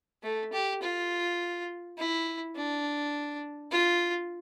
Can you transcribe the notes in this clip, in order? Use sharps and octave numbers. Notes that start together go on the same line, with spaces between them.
A3
G4
F4
E4
D4
F4